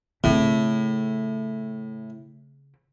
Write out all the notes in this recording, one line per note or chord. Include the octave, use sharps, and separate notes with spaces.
A2 C#3 C4